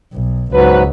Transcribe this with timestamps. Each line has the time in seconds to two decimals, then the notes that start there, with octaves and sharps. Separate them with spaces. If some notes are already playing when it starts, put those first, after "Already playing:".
0.13 B1
0.52 C#2 G#2 F#3 B4